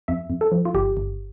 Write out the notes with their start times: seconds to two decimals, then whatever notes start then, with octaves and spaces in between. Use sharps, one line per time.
0.08 F2 E5
0.30 F2
0.41 A4
0.52 F3
0.65 F4
0.74 G1 G4
0.97 G1